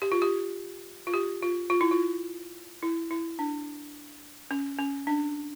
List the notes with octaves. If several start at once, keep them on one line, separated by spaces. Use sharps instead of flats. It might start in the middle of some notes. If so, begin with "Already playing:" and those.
G4
F4
G4
F4
G4
F4
F4
E4
F4
E4
E4
D4
C#4
C#4
D4